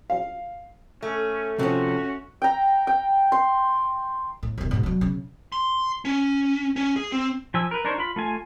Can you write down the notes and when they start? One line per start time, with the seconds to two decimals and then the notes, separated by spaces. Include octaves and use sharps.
0.10 F5
1.02 A3 C#4
1.59 C3 F3 C#4 F#4
2.42 G5 A#5
2.87 G5
3.32 C6
4.43 A2
4.58 E1 D#2
4.71 G#2 B2
4.83 F#3 D4
5.01 C#3
5.52 C6
6.05 C#4
6.76 C#4
6.96 G#4
7.12 C4
7.54 F3 G#5 E6
7.71 A#4 B4
7.85 D4 D#4 A#4 C5 C#5
7.98 F4 B5
8.16 A3 F4 G#5